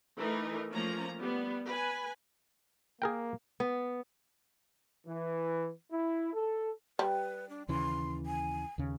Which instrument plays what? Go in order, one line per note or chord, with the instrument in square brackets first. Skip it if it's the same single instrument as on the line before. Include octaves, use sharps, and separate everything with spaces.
[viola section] E3 A3 D#4 A#4
F3 A3 A#3 C#4 A#5
G3 B3
B4 G#5
[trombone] A#3 [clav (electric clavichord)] G#4 A#4 G5
[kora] B3
[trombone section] E3
E4
A4
[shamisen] G3 [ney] B4
[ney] D4
[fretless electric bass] D#2 C#3 E3 [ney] C6
[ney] G#5
[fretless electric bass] D#2 C#3